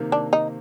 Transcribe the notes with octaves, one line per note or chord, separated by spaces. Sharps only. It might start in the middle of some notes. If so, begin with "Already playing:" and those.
Already playing: C3 D#3 A#3
D4
D#4